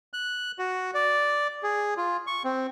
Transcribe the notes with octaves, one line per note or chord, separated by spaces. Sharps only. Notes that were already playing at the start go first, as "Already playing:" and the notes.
F#6
F#4
D5
G#4
F4
C#6
C4